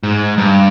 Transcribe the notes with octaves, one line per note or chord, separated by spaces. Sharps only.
G#2
G2